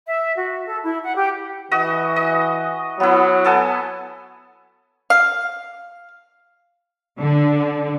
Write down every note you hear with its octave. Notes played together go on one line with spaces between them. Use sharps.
E5
F#4
A4
E4
F#5
G4
E3 F#4 D#5
D#5
F#3 B3 E4
B3 A4 G#5
F5
D3